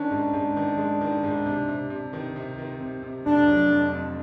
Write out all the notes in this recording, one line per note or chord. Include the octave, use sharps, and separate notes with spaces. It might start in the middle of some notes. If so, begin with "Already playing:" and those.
Already playing: D#3 C#4 D4
G#2
G#2
D#3
G#3
D#3
G#2
C3
C3
C3
D#3
C3
D#3
C3
C3
F1 D4
F#3
F2
F2